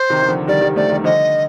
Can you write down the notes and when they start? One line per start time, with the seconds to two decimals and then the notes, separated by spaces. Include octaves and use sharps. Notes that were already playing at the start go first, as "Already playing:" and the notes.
Already playing: C5
0.10 C3 D#3
0.22 D#3
0.29 D3 F3
0.48 D#3 G3 D5
0.61 D#3 G3
0.76 F3 A3 D5
0.90 D#3 G3
1.04 D3 F3 D#5